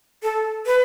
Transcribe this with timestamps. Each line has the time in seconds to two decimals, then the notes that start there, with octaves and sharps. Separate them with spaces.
0.23 A4
0.66 B4